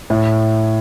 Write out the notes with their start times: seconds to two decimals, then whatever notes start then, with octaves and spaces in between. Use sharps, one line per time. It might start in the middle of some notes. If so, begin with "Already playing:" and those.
0.10 A2